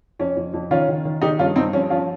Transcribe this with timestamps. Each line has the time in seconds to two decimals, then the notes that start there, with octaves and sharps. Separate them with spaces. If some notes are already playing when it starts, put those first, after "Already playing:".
0.19 F2 C#4
0.37 F2
0.54 F2
0.71 D#3 C#4 F4
0.88 D#3
1.05 D#3
1.22 D#3 D#4 G4
1.39 G2 C#4 F4
1.56 G2 C4 D#4
1.73 F3 C#4
1.90 F3 C#4 F4